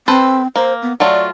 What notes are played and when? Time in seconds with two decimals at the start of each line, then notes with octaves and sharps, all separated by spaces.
0.08 C4 A4 B4 C5
0.56 A#3 C5
0.82 B3
1.00 F#3 A3 F4 D5